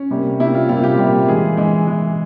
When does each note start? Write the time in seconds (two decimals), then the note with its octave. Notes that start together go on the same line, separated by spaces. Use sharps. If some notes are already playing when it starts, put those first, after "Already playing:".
Already playing: C#4
0.11 C3 G3 A#3
0.40 C3 G3 A#3 E4
0.54 F4
0.69 C3 G3 A#3 F4
0.84 G4
0.98 C3 G3 A#3
1.28 E3 G#3 G#4
1.57 E3 G#3
1.87 E3 G#3